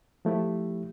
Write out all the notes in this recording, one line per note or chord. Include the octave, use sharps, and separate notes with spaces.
F3 A3 E4 G4